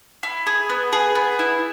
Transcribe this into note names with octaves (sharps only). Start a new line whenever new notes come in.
E4
G#4
B3
G#4
B3
E4